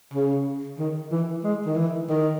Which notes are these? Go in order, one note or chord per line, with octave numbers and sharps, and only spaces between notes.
C#3
D#3
E3
G#3
D#3
E3
D#3